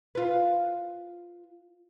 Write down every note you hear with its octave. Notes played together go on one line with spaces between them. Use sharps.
F4 B4